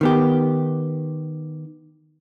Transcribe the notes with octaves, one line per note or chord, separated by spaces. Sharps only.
D#3 B3 G4